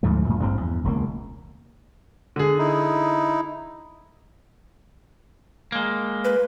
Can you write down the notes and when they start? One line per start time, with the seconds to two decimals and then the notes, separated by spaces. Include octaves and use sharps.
0.03 D2 G#2 F3 A3
0.25 F#2 A#2
0.40 A1 G2 A3 C4
0.61 E2
0.84 E1 C#2 D3 A#3
2.36 D3 G#4
2.58 D#4 E4
5.72 G#3 A#3
6.24 B4